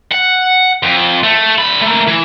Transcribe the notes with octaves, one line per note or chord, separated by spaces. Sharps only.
F#5
F2
A3
D3 B5
A3 A#3
E3